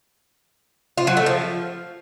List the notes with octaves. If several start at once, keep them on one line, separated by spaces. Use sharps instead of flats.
F4
F#3
A3
F3